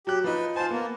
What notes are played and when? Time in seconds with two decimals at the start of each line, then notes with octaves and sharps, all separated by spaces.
0.07 F#3 G4 F#6
0.24 F3 D#4 B4
0.56 F4 C5 G#5 A5
0.71 A#3 B3